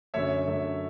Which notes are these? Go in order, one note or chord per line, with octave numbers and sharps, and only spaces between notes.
F#2 D3 F#3 A3 C#5 E5
F#2 D3 F#3 A3